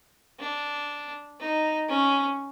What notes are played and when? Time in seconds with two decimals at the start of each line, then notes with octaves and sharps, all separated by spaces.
0.40 D4
1.40 D#4
1.89 C#4